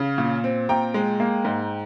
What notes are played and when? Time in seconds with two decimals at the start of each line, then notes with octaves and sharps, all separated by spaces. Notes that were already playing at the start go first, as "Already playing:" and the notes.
Already playing: C#3 F5
0.18 A#2
0.44 C4
0.69 A#2 G5 A#5
0.94 G#3
1.20 A#3
1.45 G#2